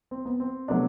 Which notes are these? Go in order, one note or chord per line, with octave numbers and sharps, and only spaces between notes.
C4
B3
C4
C3 F#3 A3 B3 D4